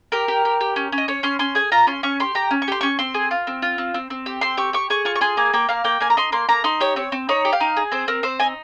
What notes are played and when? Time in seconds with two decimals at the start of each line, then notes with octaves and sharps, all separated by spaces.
0.12 G4 A#4
0.28 G4
0.45 G4
0.61 G4
0.76 C#4
0.92 C#4
0.98 D#5
1.08 C#4 C#5
1.23 C#4 C6
1.39 C#4 C6
1.55 G#4 G#5
1.72 F4 A#5
1.87 C#4 C6
2.03 C#4 C#6
2.20 G4 C6
2.35 G4 A#5
2.51 C#4
2.62 C#6
2.68 G4 C6
2.81 C#4 C#6
2.99 C4 C6
3.14 G#4
3.31 F4
3.47 C4
3.62 F4
3.78 C4
3.94 C4
4.10 C4
4.26 G4
4.41 C4 C6
4.57 G4 C#6
4.73 G4 C#6
4.90 G#4 C#6
5.05 F4 C#6
5.15 C#6
5.21 G#4 C6
5.37 A#3 G#5
5.53 A#3 G5
5.69 A#3 F5
5.84 A#3 G5
6.00 A#3 G#5
6.10 A#5
6.17 D#4 C6
6.32 A#3 C6
6.49 A#3 A#5
6.64 D#4 C6
6.80 G4 C#5
6.96 C4 C#5
7.12 C4
7.29 D#4 C#5
7.45 G4
7.53 F5
7.60 D#4
7.77 G#4
7.92 C4 C5
8.08 C4 A#4
8.23 C4 C5
8.40 D#4 G#5